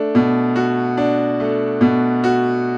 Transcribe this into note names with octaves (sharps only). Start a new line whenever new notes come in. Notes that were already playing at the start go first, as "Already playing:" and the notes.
Already playing: A3 D4
B2
F#4
D4
A3
B2
F#4